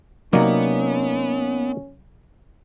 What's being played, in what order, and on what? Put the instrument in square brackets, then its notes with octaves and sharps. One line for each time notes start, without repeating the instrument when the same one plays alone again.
[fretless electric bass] C3 F#3 [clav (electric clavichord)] A#3 D#4 D5 [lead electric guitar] B3 [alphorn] C#4